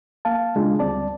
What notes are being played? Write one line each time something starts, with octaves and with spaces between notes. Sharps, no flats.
A#3 F5 A5
C#3 G#3 D4 F4
D2 G3 C4 D5 A5